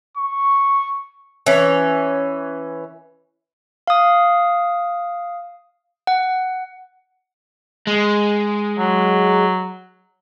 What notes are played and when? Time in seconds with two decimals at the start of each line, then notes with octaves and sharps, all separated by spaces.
0.17 C#6
1.46 E3 C#4
3.87 F5 D#6
6.07 F#5
7.87 G#3
8.79 F#3